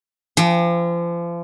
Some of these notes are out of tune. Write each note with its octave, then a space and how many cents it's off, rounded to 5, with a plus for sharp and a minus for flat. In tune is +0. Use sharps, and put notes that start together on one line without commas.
F3 -35 G5 +30